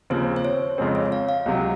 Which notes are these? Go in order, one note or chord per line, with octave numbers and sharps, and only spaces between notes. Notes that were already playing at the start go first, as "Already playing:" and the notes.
D#2 C#3 F3 C4 C5
C5
C#5
F2 C#3 G#3 C4
C#5
F5
F5
C#2 C3 F#3